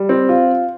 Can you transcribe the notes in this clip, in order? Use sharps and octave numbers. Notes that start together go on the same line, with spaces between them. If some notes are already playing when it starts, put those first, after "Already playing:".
Already playing: G3
C4
F4